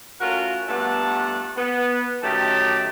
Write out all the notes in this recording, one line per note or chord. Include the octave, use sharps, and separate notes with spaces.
A3 C#4 F4 F#4 A#4
G2 A#2 A3 B3 F#5 A5
B3
F#2 D#3 F#3 A3 G4 A5